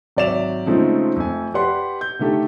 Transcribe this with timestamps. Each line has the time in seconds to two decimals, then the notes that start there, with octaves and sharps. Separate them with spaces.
0.17 G#1 F#3 D5 E5 E7 F7
0.67 C#3 F3 G#3 A3 C4 D#4
1.16 F2 A3 G#5
1.54 G4 B4 D5 F#5 C6
2.01 G6
2.19 D3 D#3 A3 G4 A4